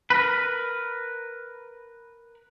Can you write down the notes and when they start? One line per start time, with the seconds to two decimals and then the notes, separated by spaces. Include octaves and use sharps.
0.10 A#4 B4